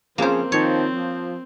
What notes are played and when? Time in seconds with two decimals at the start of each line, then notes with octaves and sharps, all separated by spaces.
0.18 C#3 F3 A#3 C4 C5
0.52 D#3 F3 C#5
0.93 F3